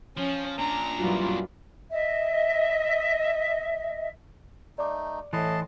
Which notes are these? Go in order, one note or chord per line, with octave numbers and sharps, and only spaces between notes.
F3 C#4
A#2 D4 A#5
F#2 E3 G3 F4 F#4
D#5 E5
A3 D#4 D5 D6
A2 E3 D#5 A5 C6